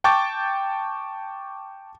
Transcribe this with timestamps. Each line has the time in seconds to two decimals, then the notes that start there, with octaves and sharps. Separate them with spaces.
0.04 G5 A5 C#6 D6 G6 A6